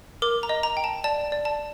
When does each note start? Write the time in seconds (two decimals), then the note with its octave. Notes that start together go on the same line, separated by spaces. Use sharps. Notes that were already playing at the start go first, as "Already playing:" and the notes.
0.22 A#4 D6
0.43 A#5
0.49 D#5
0.63 A#5
0.77 G5
0.84 A5
1.04 D5 A5
1.32 D5
1.45 A5